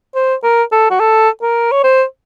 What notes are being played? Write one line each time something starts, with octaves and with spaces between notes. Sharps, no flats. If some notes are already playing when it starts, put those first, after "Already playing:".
C5
A#4
A4
F#4
A4
A#4
C#5
C5